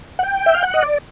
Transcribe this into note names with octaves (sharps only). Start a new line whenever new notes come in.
F#5
G5
E5
F5
F#5
D#5
D5